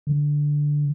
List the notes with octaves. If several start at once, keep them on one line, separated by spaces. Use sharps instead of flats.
D3